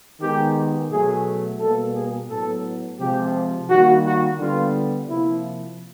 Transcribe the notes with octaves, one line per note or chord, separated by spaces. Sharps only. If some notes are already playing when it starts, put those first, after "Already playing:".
D#3 G#3 B3 G4
B2 F#3 A3 G#4
B2 G3 A#3 A4
G#4
A2 F#3 B3 A4
C3 F3 G#3 G4
D#3 G3 A#3 F#4
F#4
D3 G3 B3 F4
C3 F3 A#3 E4